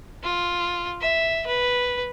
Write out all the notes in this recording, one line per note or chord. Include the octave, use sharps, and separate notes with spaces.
F4
E5
B4